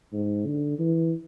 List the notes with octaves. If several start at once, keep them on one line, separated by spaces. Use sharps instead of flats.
G#2
D3
E3